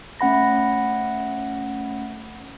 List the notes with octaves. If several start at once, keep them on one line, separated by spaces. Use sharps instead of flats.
A3 C#4 F#5 B5 A#6